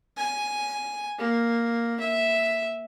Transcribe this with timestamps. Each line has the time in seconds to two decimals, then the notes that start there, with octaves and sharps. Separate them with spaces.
0.17 G#5
1.19 A#3
2.00 E5